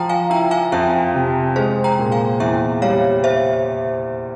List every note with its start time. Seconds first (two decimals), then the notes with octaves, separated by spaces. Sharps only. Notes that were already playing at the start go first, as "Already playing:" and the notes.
Already playing: F3 G5 A#5
0.09 F5 G#5
0.30 E4 G5 A#5
0.51 F5 G#5
0.72 F2 E5 G5
1.14 C3
1.56 G#3 G#4 C5
1.84 G5 A#5
1.99 A#2
2.12 F5 G#5
2.40 E2 E5 G5
2.82 G3 C#5 F5
3.24 C5 E5